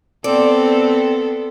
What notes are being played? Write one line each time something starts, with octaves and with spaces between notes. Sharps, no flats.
B3 C4 A4 D5